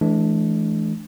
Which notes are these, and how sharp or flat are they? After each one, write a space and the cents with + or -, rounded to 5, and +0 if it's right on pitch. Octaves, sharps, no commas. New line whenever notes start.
E3 +0 A3 -45 D4 +0